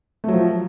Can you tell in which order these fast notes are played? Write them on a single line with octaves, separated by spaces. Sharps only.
A3 F#3 F3